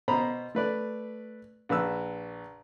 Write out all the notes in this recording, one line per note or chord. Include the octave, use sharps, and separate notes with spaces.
B2 C5 A#5 B5
A3 B4 D5
A#1 B4 E6